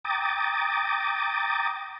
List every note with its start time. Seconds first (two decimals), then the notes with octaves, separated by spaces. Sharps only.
0.05 G5 A#5 D6 D#6 A6